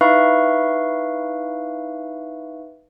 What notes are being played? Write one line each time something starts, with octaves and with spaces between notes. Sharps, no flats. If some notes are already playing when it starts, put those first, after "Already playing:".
D#4 E4 B4 E5 F5 C#6